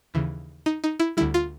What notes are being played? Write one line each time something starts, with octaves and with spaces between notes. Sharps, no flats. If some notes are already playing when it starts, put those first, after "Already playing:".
D#2 C#3 E3
D#4
D#4
E4
D2 D3 G3 E4
F4